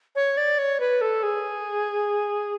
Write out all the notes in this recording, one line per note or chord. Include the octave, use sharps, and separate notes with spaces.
C#5
D5
C#5
B4
A4
G#4